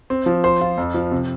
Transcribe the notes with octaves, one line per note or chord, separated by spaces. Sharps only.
C4
F3
C5
F4
F2
F3
C3